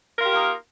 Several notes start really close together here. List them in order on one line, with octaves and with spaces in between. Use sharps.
A#4 F4 G4 A#3 D#4